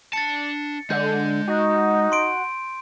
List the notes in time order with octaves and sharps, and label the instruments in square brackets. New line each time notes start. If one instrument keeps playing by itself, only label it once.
[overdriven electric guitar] D4 A5 [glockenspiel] A6 C#7
[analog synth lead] D3 [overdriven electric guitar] G#3 [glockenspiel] G6
[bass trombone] D#4 [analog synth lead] F#4
[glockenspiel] C6 D7